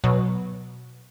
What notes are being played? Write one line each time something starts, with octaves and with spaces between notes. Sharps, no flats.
B2 F#3